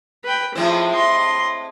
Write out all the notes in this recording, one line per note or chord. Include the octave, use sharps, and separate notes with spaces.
B4 G5
A2 F3 G#3 C4
D#5 C6